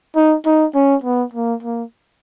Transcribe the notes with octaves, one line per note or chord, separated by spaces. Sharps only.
D#4
D#4
C#4
B3
A#3
A#3